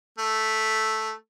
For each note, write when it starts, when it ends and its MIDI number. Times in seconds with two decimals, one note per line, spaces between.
0.19 1.12 57